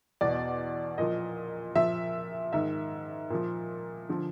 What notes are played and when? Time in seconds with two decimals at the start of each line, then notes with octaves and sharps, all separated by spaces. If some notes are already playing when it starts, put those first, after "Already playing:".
0.21 E2 B2 D5
0.98 A#2 F3 D#5
1.75 A#2 F3 E5
2.53 G#2 D#3 E5
3.30 A#2 F3
4.09 D3 F3